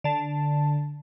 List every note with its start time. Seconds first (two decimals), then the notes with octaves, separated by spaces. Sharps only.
0.04 D3 A5